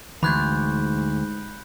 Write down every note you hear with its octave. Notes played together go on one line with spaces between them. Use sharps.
D2 G#2 E3 B5 F#6 G6